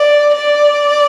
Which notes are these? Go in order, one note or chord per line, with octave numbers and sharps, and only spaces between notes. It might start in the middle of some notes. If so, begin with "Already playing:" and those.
Already playing: D5
D5